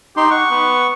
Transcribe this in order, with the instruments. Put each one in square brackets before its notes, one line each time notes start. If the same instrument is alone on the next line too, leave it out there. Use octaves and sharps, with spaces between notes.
[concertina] D#4 C6 [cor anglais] G4
[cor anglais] F#5 [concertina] C#6
[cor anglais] B3